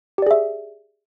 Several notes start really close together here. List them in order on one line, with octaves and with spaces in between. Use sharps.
G4 D5 G#4 E5